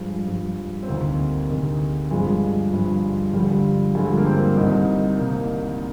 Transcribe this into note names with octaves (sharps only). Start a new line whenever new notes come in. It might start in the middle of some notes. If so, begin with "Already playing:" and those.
Already playing: G2 F3 G#3
G2 F3
C4
D2 C3 D#3 A#3
D2 C3 D#3
G2 F3 G#3
G2 F3
G2 D3 F3 G3
G2 D3 F3 G#3
A#3
C4
C2 C3 D#3 D#4
C2 C3 D#3 A#3